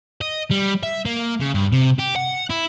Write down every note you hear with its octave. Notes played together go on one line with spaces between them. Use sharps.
D#5
G3
E5
A#3
C#3
G2
C3
G4
F#5
E4